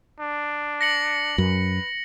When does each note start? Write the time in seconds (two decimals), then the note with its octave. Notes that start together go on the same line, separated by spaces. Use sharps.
0.20 D4
0.81 A#6 C#7 F#7
1.38 F#2 B4